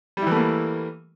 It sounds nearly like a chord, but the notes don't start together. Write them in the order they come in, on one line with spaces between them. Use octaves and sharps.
G3 E4 E3 A3 A#3